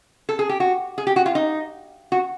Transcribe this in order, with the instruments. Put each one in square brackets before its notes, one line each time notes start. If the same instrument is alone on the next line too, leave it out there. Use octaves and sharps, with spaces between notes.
[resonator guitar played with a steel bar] A4
G#4
G4
F#4
G#4
G4
F#4
F4
D#4
F#4